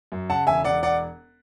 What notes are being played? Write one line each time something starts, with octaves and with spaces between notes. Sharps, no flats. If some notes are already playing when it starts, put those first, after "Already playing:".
F#2
C#3 F#5 A5
E1 E5 G#5
E1 D5 F#5
D5 F#5